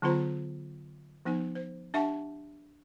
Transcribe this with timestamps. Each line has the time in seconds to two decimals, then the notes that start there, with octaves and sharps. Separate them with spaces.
0.02 D3 F#3 B3 F4 C5 A#5
1.25 F3 B3 D#4 G#5
1.55 C5
1.94 D4 G4 E5 F#5 A5 C#6